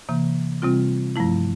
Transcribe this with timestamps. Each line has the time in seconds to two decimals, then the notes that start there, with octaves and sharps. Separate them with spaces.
0.09 C3 E3 A#3
0.62 C3 G3 C4 F4
1.16 G2 F3 A3 E4